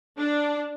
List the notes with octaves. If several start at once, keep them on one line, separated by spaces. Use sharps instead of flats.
D4